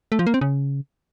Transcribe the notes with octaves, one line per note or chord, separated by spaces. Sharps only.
A3
F3
A#3
C4
C#3